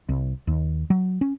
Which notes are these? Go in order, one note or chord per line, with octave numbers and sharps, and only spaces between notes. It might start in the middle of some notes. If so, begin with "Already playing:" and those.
C2
D#2
F#3
C#4